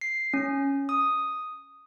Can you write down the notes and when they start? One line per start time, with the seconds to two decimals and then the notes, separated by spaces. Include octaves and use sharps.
0.01 C7
0.33 C#4
0.89 D#6